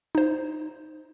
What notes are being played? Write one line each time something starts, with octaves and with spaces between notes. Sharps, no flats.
D#4 C5